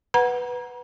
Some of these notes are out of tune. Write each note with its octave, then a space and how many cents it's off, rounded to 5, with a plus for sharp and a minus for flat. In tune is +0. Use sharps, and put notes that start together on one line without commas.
B4 +0 F#5 +0 A#5 +35